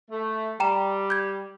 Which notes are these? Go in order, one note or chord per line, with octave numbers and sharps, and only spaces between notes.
A3
G3 G5 A#5 E7
G6 G#6